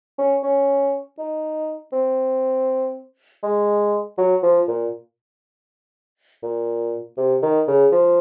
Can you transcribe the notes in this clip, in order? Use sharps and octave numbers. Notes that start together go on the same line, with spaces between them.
C#4
C#4
D#4
C4
G#3
F#3
F3
A#2
A#2
C3
D#3
C#3
F3